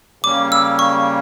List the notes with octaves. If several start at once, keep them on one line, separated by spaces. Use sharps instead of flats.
C#3 G3 A#3 C#4 D6
E6
C#6